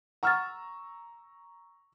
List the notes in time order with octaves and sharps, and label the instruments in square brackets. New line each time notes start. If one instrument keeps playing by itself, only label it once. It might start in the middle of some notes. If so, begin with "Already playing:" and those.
[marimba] F#5 F6 A6 [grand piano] A#5 C#6 E6